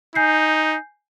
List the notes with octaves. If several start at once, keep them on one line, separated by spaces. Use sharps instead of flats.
D#4 G#5 G6 C7